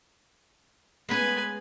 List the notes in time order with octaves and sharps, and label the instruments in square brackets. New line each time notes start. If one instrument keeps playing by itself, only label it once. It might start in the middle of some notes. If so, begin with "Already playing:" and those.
[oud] G#3 B3 C#4 [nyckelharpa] B4 G#5